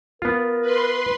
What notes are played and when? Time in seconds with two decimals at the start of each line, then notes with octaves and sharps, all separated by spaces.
0.22 B3 F4 A#4
0.62 B4 C6